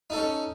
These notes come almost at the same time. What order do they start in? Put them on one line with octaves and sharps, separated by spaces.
D#4 A4 C#4